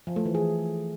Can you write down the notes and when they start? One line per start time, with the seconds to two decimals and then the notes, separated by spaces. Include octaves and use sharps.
0.07 F3
0.16 A3
0.25 E3
0.35 G#4